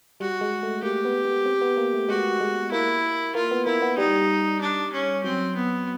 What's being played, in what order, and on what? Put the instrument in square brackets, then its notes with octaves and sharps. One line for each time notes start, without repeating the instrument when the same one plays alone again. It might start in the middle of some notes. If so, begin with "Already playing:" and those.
[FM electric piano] G3 [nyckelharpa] F#4
[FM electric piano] G#3
A3
[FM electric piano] A#3 [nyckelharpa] G4
[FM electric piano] B3
B3
C4
B3
A#3
A3
[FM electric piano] G#3 [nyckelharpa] F#4
[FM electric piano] G#3
[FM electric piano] A#3 [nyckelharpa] E4
[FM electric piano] A#3 [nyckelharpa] F4
[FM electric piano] B3
[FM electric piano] A#3 [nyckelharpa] E4
[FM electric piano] B3
[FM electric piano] G3 [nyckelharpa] D#4
[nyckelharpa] D4
C#4
[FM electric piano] F#3 [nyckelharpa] C4
[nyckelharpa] B3